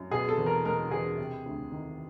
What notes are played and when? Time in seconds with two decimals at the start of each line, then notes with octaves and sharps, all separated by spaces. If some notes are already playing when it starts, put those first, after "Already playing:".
Already playing: F#2
0.11 B2 G#4
0.29 A4
0.38 E2
0.46 A#4
0.65 G#3 A#4
0.91 E2 G#4
1.18 C3
1.46 D2
1.72 D#3